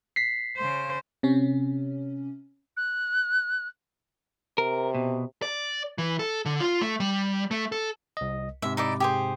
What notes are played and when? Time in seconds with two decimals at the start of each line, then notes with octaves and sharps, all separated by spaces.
0.16 B6 C7
0.57 C#3 C5
1.23 C3 C#4
2.77 F#6
4.58 C3 A#4
4.94 B2
5.42 D5
5.98 E3
6.19 A4
6.46 D3
6.60 F4
6.81 A3
7.00 G3
7.51 A3
7.72 A4
8.17 C2 D#5
8.62 G#2 C3 E5
8.77 D#4 E4 D5
9.00 G4 G#4 C5